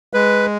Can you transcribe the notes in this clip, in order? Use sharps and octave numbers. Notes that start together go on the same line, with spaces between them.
G#3 B4